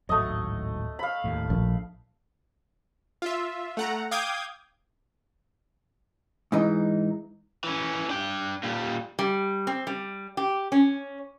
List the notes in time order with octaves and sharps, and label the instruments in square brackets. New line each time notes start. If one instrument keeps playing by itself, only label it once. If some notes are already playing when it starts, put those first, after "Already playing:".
[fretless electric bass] D1 G#1 F#3 [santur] A3 D#5
[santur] F5 B5
[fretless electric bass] D1 D#2 A2
[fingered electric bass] A#1
[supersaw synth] F4 E5
A3 F#5 A#5
F5 G5 D6 D#6 G6 G#6
[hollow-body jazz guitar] G#2 E3 D#4
[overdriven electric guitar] E3 C#4
D4 G5
A#2 G3
[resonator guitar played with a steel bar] G3
C4
G3
G4
C#4